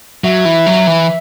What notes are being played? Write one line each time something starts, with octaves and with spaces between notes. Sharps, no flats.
F#3 E5
E3
F#3
E3